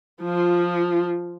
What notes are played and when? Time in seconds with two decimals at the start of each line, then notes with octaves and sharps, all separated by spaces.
0.22 F3 F4